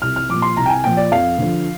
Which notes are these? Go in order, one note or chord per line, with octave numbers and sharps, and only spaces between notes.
C2 F6
F6
A#2 F3 D6
C6
C2 A#5
G5
G#5
A#2 F3 G5
D5
F2 F5
D3 F3